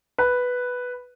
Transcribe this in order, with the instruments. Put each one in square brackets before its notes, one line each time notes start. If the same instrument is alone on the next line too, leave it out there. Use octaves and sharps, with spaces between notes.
[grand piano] B4